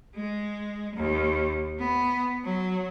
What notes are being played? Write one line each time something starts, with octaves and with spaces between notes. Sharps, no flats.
G#3
D#2
B3
F#3